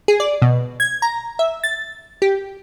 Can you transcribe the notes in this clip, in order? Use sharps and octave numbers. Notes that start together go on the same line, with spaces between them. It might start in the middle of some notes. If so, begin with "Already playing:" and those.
G#4
D5
B2
G#6
A#5
E5
A6
G4